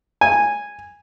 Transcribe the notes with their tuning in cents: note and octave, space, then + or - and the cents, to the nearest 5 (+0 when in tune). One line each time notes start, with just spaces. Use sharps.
G#5 -10